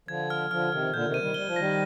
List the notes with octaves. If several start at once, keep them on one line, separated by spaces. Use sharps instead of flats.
D3 F3 G#6
F6
D3 F3 F6
C3 D#3 F6
A#2 D3 G6
C3 D#3
D#7
D#3 G3
G3 G7
F3
D#3 G3 A#6